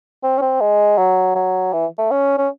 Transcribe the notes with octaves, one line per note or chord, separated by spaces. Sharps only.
C4
C#4
C4
G#3
F#3
F#3
E3
A3
C#4
C#4